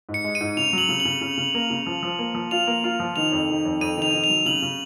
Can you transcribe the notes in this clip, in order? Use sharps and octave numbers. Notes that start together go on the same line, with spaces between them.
G#2
C#7
G#3
D#7
G#2
C#3 F7
F#3
F#7
C#3
F#7
C#3
C#3
C#3
A#3
C#3
F3
F3
A#3
F3
F4 F7
A#3
F4
F3
D#3 F7
F2
D#3
F2
F2 D#7
D#3 F7
D#3
F7
F#3
C#3 F#7
C#3